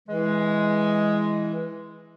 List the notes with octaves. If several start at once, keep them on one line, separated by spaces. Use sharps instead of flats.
E3 G#3